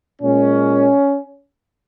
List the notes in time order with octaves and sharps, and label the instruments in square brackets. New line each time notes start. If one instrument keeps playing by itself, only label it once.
[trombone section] A#2 G#3 C#4